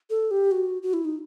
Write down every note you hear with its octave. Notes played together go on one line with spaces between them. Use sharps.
A4
G4
F#4
F#4
E4
D#4